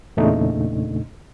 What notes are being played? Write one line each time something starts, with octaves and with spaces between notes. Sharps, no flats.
E2 A#2 C#3 A3 D4 D#4